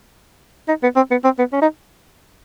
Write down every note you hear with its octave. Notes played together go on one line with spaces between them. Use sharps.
D#4
B3
C4
B3
C4
B3
C#4
D#4